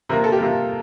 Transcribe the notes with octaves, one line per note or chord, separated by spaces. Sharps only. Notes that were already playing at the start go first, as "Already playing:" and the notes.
C3 F3 A#3 A#4
A4
G4
C3 F3 A#3 F4